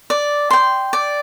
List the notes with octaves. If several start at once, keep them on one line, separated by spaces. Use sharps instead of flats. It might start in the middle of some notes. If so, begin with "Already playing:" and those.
D5
G5 C6
D5